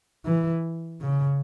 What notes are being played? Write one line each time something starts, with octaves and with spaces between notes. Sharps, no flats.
E3
C#3